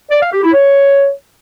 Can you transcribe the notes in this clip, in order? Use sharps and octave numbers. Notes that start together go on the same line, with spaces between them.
D5
F5
G4
E4
C#5